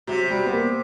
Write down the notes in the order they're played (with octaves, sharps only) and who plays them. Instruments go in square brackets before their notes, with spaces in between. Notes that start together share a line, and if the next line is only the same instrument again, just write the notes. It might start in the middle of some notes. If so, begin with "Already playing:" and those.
[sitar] C3 [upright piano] F#3
[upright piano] G3
B3
A#3